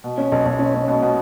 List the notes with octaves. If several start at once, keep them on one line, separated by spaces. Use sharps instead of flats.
B2
C#4
B1
B1
C#4
C#4
B2
B2